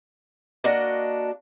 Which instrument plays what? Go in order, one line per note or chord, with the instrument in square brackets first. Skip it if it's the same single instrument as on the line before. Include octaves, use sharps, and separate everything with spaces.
[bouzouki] A#3 D4 F#4 D#5